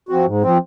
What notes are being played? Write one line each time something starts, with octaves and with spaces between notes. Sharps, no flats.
F3 C4 F#4
G#2
F3 C4